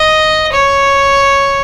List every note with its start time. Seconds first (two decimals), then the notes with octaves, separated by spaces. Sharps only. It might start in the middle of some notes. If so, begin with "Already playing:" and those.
Already playing: D#5
0.52 C#5